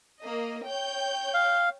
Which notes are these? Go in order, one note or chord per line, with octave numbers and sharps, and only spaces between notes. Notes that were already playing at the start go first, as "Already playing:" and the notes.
A#3 D#5
C#5 G5 G6
F5